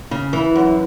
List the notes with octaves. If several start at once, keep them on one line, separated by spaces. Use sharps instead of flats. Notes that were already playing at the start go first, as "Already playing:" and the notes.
C#3
E3
F#2